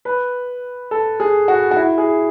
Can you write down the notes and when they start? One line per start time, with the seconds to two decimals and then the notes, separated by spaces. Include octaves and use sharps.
0.05 B4
0.91 A4
1.20 G#4
1.48 F#4
1.71 F#4
1.76 E4
1.98 G#4